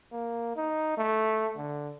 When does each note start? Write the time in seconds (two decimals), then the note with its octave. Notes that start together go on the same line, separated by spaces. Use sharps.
0.12 A#3
0.57 D#4
0.98 A3
1.57 D3